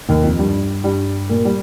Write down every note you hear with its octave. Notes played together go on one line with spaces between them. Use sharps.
D#2 D#3
F2 F3
G2 G3
G2 G3
A#2 A#3
G3